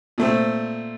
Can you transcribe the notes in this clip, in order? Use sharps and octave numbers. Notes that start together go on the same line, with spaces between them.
A#2 A3 C4